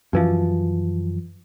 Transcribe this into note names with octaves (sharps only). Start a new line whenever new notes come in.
F#2 E3 F3